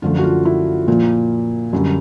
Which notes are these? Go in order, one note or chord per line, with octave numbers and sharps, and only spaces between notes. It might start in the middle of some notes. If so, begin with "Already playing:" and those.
F#2 D3 F3 A3 F4
F#4
F4
E4
A#2 F3 A#3
F#2 D3 G3